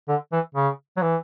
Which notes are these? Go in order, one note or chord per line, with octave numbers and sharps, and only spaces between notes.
D3
E3
C#3
F#3
E3